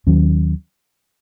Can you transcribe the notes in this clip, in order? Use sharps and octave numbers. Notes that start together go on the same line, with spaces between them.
D#2 D#3 F#3 C#4